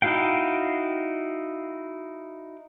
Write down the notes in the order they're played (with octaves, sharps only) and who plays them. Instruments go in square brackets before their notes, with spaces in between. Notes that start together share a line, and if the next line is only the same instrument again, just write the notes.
[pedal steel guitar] D#4 E4 F#4 F5 G5